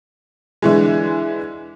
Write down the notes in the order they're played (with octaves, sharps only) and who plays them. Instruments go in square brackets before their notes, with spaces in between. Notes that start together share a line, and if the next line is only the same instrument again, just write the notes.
[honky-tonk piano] D3 E3 G#3